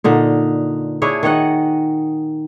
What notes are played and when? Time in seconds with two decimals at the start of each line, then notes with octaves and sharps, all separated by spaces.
0.04 A#2 D3 D#4
1.02 D4 E4 G#4 C#5
1.23 D#3 C#5 D#5 F#5